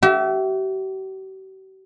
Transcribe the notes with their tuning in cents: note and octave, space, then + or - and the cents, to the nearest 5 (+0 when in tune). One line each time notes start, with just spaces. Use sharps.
G4 -45 E5 +0